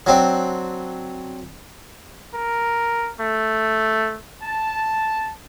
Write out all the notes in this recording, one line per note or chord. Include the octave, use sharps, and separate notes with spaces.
F#3 C4 D4
A#4
A3
A5